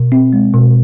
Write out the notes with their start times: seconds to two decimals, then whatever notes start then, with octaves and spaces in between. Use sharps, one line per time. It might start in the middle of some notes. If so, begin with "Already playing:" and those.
Already playing: B2
0.12 C4
0.33 G#3
0.54 B2